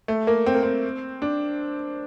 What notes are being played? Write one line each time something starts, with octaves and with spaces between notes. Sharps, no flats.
A3
A#3
C4
A#3
C4
D4